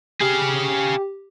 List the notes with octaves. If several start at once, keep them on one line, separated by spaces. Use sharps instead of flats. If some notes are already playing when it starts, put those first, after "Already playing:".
G4 G#4 F5